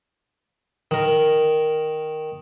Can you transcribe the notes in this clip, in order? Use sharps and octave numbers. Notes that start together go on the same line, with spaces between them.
D#3 A#4